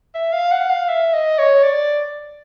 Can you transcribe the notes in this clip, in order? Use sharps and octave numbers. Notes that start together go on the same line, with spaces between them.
E5
F5
F#5
F5
E5
D#5
C#5
D5